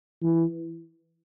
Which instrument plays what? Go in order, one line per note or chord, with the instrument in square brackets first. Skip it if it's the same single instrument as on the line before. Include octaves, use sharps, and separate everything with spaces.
[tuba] E3